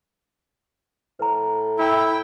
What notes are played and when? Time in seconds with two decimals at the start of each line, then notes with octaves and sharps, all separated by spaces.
1.19 A2 B4 A#5
1.78 E4 G5